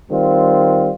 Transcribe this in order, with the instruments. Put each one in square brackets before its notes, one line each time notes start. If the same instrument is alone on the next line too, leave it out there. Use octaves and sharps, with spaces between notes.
[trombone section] D#3 G3 C4 F4